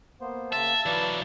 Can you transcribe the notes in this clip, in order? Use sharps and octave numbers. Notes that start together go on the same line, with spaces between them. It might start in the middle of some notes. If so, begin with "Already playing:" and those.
A#3 B3 C5
C#3 A#3 E5 A5
E3 F#3 B4 D5 F5